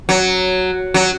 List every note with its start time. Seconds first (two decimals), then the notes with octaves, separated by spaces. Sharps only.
0.09 F#3
0.94 F#3